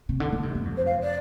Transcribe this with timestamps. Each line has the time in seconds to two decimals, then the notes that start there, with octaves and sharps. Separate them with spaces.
0.09 C3
0.20 D3
0.32 D3
0.43 C3
0.55 G2
0.65 F2
0.77 C5
0.86 F5
1.02 D5